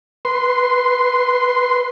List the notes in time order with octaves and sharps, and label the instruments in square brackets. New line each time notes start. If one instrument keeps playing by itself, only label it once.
[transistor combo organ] B4 C6